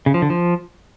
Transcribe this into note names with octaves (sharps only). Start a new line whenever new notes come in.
C#3
F3
D3
F3